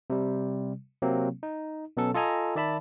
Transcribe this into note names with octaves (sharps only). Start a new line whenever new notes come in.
C3 G3
C3 F#3 A#3 C4
D#4
B2 F#3 B3 C#4 A4
F4 A4 D#5 G#5 A#5
D#3 D5 E5 A5 B5